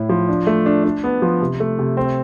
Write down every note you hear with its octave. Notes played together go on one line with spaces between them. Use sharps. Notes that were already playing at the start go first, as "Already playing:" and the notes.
Already playing: A2 E4
F3
D4
A3
D4
D4
B3
F3
C3
A3
C3
C4